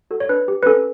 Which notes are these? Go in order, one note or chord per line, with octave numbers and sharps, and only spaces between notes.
F#4 A4
C#5
D4 B4
G4
B4
C#4 A4